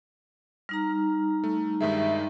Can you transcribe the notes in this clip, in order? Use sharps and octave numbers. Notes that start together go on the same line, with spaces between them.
G3 D#4 A#5 F6
A3
G2 D#3 G#3 E5